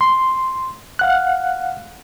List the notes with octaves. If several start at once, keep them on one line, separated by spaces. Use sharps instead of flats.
C6
F5 F#5 F#6